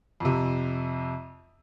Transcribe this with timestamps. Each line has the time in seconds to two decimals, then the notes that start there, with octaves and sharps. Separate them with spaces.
0.20 F2 C3